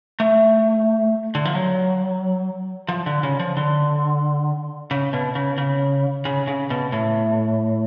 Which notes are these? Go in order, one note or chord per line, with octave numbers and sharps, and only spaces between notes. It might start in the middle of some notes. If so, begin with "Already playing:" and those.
A3
D3
F3
F#3
F3
D3
C#3
F3
D3
C#3
B2
C#3
C#3
C#3
C#3
B2
A2